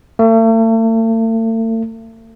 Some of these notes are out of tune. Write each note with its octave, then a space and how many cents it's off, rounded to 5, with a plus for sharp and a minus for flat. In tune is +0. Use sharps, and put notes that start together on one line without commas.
A3 +40